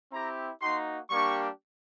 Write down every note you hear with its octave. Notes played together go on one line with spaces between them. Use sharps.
C4 E4 G4 A#5
A#3 D#4 F#4 C6
G3 A#3 D4 G4 C#6